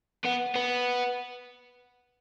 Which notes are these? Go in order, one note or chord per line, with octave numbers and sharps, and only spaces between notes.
B3
B3